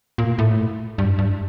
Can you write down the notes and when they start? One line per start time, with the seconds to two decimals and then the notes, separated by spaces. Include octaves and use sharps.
0.18 A#2
0.38 A2
0.98 G2
1.19 G2